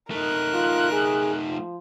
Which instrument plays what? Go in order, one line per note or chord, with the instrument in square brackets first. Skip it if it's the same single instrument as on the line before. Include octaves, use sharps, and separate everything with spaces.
[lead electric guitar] A3 D#4 [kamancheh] A#4 F#6
[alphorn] F4
G#4
F3